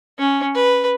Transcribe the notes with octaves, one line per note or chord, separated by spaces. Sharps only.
C#4
B4